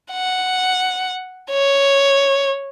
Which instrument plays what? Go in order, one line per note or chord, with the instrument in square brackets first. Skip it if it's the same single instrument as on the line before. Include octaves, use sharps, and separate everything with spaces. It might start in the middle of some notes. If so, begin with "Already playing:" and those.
[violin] F#5
C#5